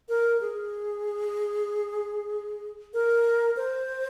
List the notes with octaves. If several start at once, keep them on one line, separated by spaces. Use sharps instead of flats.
A#4
G#4
A#4
C5